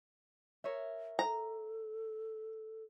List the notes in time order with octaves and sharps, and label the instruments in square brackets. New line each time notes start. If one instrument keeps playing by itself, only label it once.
[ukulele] A#4 C#5 E5
[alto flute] A4 [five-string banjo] A#5